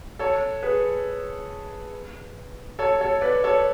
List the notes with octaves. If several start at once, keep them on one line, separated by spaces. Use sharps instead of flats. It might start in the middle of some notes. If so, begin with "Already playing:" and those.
A4 C#5
G#4 B4
A4 C#5
A4 C#5
B4 D5
A4 C#5